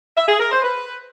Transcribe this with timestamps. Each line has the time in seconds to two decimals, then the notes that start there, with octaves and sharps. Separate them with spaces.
0.17 E5
0.28 G#4
0.40 A#4
0.51 C5
0.62 B4